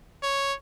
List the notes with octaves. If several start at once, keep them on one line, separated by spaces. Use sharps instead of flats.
C#5